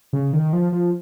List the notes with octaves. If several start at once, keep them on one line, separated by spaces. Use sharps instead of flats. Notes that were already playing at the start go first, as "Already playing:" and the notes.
C#3
D#3
F3
F3